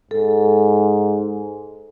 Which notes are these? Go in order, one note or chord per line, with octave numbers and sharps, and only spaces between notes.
G#2 A4